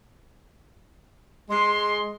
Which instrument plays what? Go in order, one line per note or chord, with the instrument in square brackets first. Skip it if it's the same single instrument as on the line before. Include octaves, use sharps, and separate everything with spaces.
[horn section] G#3 [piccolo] C6